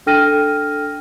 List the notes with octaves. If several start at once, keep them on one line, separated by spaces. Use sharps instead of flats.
D4 A4 G5 F6 A#6 D#7